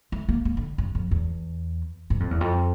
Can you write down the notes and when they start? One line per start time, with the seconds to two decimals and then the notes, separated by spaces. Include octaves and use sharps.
0.12 A3
0.29 A#3
0.45 A#3
0.57 D3
0.78 G2
0.95 F2
1.11 E2
2.10 G2
2.20 F2
2.31 E2
2.41 F2